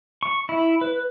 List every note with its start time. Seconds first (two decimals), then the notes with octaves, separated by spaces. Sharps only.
0.23 C#6
0.49 E4
0.81 B4